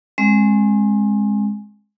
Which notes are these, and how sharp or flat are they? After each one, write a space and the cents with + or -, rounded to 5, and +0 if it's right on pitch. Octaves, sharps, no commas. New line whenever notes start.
G#3 +0 C4 +35